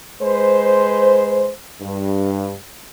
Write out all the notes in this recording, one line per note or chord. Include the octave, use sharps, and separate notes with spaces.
G#3 B4 C5
G2